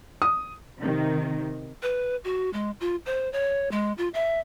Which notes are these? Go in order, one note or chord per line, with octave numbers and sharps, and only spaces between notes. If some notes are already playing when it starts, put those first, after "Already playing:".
D#6
C3 D#3
B4
F#4
G#3
F4
C5
C#5
G#3
F4
E5